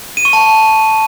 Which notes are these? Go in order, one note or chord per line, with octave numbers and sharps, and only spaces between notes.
D#7
C#6
A5